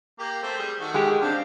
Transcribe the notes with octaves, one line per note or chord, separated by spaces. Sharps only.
A#3 G4
A3 C4 C5
G3 G#4
D#3 A3 F#4
G#3 G4
C4 D4 G4 F5